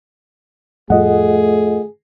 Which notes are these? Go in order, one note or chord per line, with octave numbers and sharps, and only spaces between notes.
F2 A2 G3 A3 F4 G#4 D#5 F#5